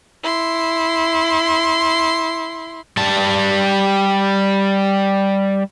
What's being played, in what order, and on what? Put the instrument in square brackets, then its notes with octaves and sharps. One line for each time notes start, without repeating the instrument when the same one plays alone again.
[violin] E4 C6
[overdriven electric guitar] G3 A5